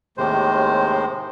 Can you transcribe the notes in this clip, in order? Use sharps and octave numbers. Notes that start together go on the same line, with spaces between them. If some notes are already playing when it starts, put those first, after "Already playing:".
D#2 A2 C3 D#3 G#3 C5